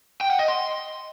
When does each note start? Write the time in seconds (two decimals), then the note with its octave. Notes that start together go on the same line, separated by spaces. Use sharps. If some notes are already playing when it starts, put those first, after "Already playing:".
0.21 G5
0.30 F#5
0.39 D#5
0.48 C6